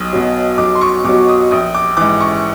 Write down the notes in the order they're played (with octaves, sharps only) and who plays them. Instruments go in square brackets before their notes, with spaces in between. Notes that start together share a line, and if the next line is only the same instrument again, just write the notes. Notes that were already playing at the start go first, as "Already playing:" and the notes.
Already playing: [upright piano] B1 D#6
B2 F#3
B1 D6
C6
C#6
B2 F#3 D6
D#6
A#1 D#6
D6
G#2 E3 D6
C#6